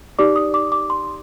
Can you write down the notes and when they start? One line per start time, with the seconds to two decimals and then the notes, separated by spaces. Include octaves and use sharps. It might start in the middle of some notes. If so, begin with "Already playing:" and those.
0.19 D#4 G4 D5 D6
0.36 D#6
0.54 D6
0.72 D6
0.90 C6